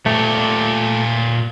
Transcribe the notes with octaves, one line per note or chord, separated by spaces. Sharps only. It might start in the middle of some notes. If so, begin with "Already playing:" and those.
A#2 A3 G4